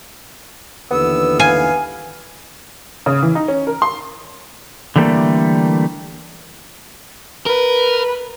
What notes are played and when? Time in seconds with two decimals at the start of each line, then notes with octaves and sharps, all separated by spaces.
0.91 D#2 D3 E3 B3 E6
1.39 F5 G#5
3.06 C#3
3.22 E3
3.35 D#4
3.48 C#4
3.67 A#4
3.82 C6
4.96 D3 E3 G3 A3 A#3
7.46 A#4 B4